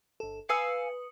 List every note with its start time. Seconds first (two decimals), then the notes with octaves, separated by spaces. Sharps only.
0.20 G1 A4
0.49 B4 F5 G#5 D#6 E6 C#7